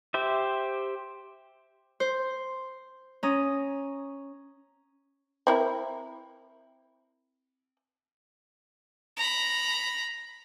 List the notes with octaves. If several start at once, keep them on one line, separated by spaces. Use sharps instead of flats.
G4 C5 E5
C5
C#4 A#5 D#6
C4 E4 A#4
A#5 B5